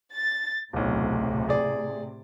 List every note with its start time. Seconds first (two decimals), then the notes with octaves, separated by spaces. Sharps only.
0.14 A6
0.73 D1 B1 A2 C3
1.49 G#4 D5